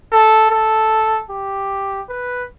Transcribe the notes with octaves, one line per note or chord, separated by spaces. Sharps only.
A4
A4
G4
B4